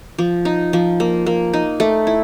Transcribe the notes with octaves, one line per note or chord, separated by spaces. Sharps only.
F3
D#4
F3
A#3
A#3
D#4
A3
E4